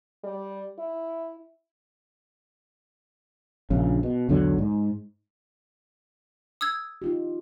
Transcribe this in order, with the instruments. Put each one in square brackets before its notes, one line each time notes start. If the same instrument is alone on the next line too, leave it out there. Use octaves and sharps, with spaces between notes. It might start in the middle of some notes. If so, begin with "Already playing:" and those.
[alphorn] G3
E4
[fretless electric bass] A#1 C#3
B2
B1 E2 D3 F#3
G#2
[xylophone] D#6 E6 G#6
[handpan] D#4 F4 G4